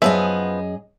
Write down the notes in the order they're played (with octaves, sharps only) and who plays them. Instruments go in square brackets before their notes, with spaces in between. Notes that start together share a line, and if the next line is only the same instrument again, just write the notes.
[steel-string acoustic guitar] F#2 G#4 D#5 [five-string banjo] F3 B3 E5